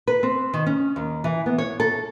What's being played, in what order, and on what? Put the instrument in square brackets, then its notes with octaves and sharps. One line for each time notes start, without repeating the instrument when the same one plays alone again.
[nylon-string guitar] B4
C4
D#3
C#4
D#2
E3
B3
C#5
A4